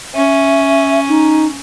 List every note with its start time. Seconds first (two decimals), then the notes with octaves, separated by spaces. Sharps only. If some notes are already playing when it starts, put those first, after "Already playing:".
0.14 C#4 E5
1.08 D#4